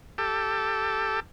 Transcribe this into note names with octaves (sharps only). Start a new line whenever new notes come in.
G4 A4